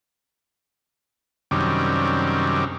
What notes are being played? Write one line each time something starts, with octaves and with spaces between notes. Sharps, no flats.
F#2 C3 D#3 G3 C#4 D4